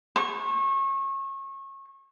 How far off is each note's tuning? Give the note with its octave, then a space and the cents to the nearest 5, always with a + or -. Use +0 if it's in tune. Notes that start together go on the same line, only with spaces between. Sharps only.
C#6 -30